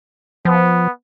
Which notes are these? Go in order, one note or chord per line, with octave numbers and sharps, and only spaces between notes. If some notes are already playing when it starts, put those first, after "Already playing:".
F3 B3